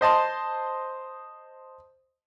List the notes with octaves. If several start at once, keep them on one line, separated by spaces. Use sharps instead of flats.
C5 D#5 A5 C6